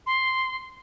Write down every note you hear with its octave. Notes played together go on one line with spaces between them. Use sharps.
C6